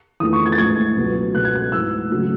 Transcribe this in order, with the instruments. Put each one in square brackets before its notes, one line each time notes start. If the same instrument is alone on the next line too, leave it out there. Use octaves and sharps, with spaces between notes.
[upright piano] E2 D#3 A3 D#6
C#6
G#6
A6
A2 E3 G#3 G#6
C#2 B2 F#3 A3
C#2 B2 G#3 F#6
G#6
F#6
G#2 E3 A3 E6
C#3 F#3 A3